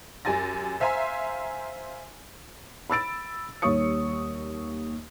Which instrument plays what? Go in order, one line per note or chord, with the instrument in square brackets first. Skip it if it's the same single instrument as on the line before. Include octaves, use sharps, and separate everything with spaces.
[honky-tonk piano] F#2 G4 G#5 A6 A#6
C5 E5 F5 G#5 A#5 C6
[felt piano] B5 E6 A6 D7
D#2 G3 C#5 C#6 D#6 C#7